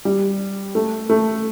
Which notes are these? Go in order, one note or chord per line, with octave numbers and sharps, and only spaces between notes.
G3
A3
A3